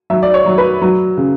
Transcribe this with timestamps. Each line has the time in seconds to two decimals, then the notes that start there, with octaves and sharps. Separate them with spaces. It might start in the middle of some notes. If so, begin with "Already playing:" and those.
0.10 F#3 E5
0.23 D5
0.34 C#5
0.46 F#3
0.58 B4
0.82 F#3
1.17 C#3